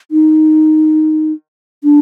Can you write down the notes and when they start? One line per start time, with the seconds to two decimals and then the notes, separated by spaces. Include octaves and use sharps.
0.11 D#4
1.84 D4